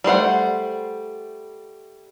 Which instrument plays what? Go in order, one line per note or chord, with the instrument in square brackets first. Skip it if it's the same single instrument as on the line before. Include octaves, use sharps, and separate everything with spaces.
[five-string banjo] G3 A3 C5 F#5